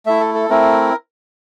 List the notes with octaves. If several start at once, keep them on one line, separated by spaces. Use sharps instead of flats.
A3 E4 E5
A4
A4
A3 C4 E4 A#4